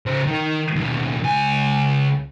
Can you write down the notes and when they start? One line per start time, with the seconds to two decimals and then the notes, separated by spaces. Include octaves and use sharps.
0.06 C#3 C5
0.27 D#3 A#4
0.76 D#2 B2
1.24 C#2 G#5